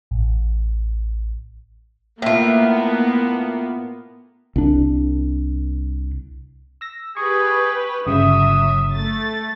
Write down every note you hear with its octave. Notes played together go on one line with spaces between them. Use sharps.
A1
A2 A#3 B3 F4
C2 D4
E6 A#6
G4 G#4 B4 C#6
G1 C#3 F#3 E5 D#6
A3 A6